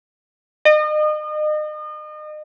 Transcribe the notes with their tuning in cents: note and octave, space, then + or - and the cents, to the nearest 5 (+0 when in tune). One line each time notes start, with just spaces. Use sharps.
D#5 -35